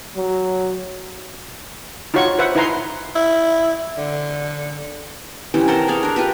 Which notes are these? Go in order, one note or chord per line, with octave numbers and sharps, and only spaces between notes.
F#3
D#4 F4 F#4 C#5 C#6
B4 C5 E5 F#5
D#4 E4 B4 G#5 A#5 C6
E4
D3
C3 E3 G3 C#4
A#4 C5 F#5 A5
G#4 C#5 D5 F5
D4 A#4
F4 G4 A#4 B4